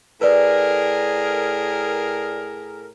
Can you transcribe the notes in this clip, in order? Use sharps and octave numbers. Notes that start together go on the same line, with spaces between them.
A2 G#4 A#4 B4 D5